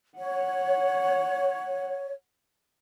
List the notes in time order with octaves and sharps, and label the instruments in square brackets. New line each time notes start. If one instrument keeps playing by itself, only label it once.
[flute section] C#5 [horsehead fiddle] F#5